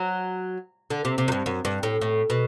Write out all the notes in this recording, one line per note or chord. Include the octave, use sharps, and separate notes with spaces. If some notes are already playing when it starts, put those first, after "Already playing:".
Already playing: F#3
D3
C3
C3
F#2
G2
F#2
G2
A2
A2
B2